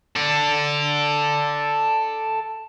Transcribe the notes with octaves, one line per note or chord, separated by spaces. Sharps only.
A4 D5